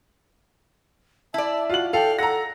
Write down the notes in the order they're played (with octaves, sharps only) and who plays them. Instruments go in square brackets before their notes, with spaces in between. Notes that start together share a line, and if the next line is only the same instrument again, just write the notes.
[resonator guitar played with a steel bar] E4 D5 [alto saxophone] E5 [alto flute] A5
[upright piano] F4 F#7 [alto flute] F#4
[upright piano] A4 [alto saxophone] F5 [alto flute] G5
[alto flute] A4 [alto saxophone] F#5 [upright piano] A#5 A#6